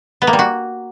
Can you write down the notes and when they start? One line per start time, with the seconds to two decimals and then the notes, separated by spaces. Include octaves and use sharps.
0.22 B3
0.27 A#3
0.33 G3
0.39 F#4